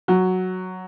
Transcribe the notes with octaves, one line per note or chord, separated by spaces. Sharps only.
F#3